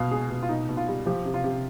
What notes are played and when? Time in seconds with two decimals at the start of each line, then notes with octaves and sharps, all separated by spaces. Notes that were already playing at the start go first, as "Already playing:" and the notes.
Already playing: B2 F5
0.11 G#3 G#4
0.30 B2
0.42 F4
0.49 B2 D#4
0.68 B2
0.77 F4
0.88 G3
1.06 F3 G4
1.25 C3
1.34 F4
1.44 C3